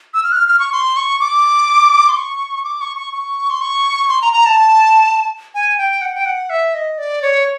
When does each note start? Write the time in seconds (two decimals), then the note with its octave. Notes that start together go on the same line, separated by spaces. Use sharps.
0.14 E6
0.23 F6
0.32 F#6
0.36 F6
0.48 F6
0.60 C#6
0.73 C6
0.97 C#6
1.20 D6
2.09 C6
2.17 C#6
2.64 D6
2.81 C#6
2.97 C#6
3.13 C#6
3.50 C6
3.61 C#6
4.09 C6
4.22 A#5
4.33 A#5
4.46 A5
5.54 G#5
5.78 G5
6.01 F#5
6.15 G5
6.25 F#5
6.50 E5
6.74 D#5
6.98 D5
7.22 C#5